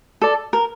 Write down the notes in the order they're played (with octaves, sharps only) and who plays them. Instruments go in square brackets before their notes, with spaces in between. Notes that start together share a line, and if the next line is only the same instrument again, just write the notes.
[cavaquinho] A4 D5
A#4